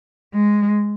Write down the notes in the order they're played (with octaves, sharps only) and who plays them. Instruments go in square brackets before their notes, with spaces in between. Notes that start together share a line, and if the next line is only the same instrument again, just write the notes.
[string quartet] G#3